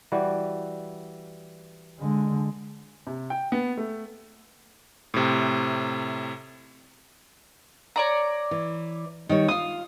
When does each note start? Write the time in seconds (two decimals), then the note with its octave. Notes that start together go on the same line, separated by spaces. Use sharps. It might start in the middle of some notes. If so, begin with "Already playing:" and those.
0.12 E3 G3 F#4
2.00 D3 G#3
3.07 C3
3.30 G5
3.52 B3
3.78 A3
5.14 A2 C3
7.96 C#5 D5 A#5
8.51 E3
9.29 D#3 G3 C#5
9.48 F4 F5 D#6